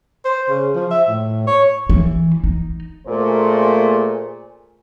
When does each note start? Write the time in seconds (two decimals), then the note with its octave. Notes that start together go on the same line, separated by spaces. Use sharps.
0.25 C5
0.49 C#3
0.75 F3
0.91 E5
1.08 A2
1.47 C#5
1.90 E3
2.44 D#4
3.07 A#2 A3 A#3 G#4 A#4 C5